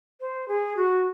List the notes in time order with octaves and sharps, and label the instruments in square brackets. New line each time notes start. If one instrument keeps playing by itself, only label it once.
[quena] C5
G#4
F#4